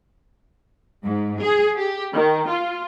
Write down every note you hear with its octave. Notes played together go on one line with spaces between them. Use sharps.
G#2
G#4
G4
D#3
F4